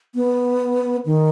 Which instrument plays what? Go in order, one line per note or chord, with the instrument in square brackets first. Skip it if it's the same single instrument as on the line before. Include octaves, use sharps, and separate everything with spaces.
[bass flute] B3
D#3